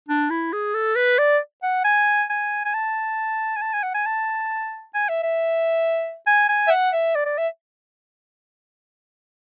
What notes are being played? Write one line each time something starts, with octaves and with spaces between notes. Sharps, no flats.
D4
E4
G#4
A4
B4
D5
F#5
G#5
G#5
G#5
A5
G#5
A5
G#5
F#5
G#5
A5
G#5
E5
E5
G#5
G#5
E5
F#5
E5
D5
D5
E5